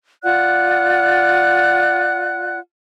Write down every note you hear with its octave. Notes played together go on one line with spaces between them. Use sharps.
F4 D5 F#5 F#6